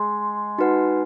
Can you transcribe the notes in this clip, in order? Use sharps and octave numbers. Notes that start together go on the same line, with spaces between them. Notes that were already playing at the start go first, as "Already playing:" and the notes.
Already playing: G#3
D#4 F#4 B4 F#5